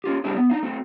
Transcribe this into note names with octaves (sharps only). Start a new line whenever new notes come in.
C#4 F4 G4
G3 C4 D4 E4 G4 G#4
B3
D4 D#4 F5
A3 C4 F#4